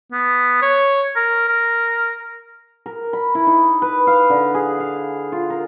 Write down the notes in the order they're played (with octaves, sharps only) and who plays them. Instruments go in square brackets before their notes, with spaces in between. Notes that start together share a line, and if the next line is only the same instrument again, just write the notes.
[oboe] B3
C#5
A#4
A#4
[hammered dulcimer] A#4
B5
E4
D#4
B4
F5
D3
G#4
F5
F4
A#4